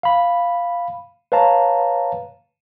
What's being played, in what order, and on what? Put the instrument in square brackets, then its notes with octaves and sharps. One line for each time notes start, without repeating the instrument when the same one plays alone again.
[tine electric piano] F5 B5
B4 C#5 F5 A5 A#5